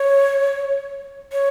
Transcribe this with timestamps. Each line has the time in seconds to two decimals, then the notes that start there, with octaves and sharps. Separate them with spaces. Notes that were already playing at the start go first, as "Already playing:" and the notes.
Already playing: C#5
1.32 C#5